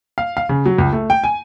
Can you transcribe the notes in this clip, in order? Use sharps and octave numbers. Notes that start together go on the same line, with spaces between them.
F5
F5
C#3
F#3
C#2
A3
G5
G#5